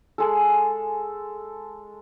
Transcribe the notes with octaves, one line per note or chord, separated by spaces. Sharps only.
G#3 A4